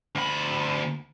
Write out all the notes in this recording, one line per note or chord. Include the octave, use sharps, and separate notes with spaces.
D2 B5